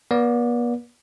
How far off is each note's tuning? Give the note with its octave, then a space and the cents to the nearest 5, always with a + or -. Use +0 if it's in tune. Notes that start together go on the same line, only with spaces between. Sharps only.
B3 -45 D5 -25